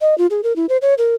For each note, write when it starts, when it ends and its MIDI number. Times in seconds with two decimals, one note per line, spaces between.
0.01 0.17 75
0.18 0.27 65
0.30 0.41 68
0.43 0.55 70
0.56 0.66 64
0.69 0.77 72
0.82 0.94 73
0.98 1.15 70